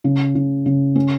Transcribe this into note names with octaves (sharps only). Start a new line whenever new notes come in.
C#3
C#3
C#3
C#4